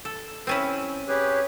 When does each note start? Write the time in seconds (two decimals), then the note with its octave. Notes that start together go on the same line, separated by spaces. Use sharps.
0.05 A4
0.47 C4 C#4 E4
1.08 G4 G#4 B4 C#5